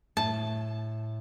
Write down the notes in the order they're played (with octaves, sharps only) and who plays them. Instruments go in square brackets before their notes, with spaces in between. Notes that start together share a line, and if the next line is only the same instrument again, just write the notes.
[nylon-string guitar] A2 [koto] A5